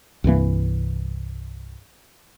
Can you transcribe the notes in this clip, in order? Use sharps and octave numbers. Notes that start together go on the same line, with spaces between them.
C2 G2 E3 A#3